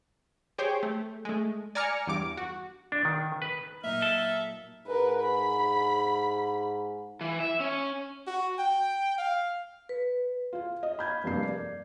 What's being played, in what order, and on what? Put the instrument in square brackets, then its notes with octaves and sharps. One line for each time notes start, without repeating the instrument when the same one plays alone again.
[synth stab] G4 G#4 C5 C#5 G5
A3
G#3 A3
D5 G#5 A#5 F6 C#7
E2 G2 D6
F#4
[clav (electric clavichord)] D4
D#3
B4
[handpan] A#2 F#3 A#3 [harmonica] D#4 F6 [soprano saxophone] E5
[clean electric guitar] A4
[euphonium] G#2 [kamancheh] A#4 B4
[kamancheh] B5
[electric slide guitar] E3
E5
C#4
[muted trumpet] F#4
G5
F5
[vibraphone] B4
[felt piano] F4 F5
D#5
B5 G6 G#6
F1 G2 A#3 C7
D5